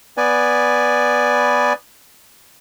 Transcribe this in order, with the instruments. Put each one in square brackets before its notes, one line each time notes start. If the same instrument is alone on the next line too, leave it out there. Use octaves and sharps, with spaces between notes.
[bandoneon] B3 B4 D5 G#5